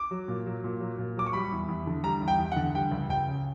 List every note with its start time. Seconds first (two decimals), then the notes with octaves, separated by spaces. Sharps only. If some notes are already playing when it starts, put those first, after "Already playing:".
Already playing: D6
0.11 F#3
0.28 A#2
0.46 F#3
0.64 A#2
0.80 F#3
0.98 A#2
1.17 F#3 D6
1.26 C#6
1.33 G3 B5
1.52 E2
1.69 E2
1.87 D3
2.04 G3 A#5
2.22 E2
2.28 G5
2.39 E2
2.52 F#5
2.56 D3
2.74 G3 G5
2.92 C#2
3.10 C#2 G5
3.27 C#3